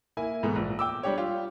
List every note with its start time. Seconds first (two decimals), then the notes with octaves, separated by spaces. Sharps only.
0.17 A#3 E4 G#5
0.43 G#2 B2 E3 A3 B3
0.56 A#1
0.79 G5 D6 E6
1.03 G3 D4 G4 C#5
1.18 F4 G4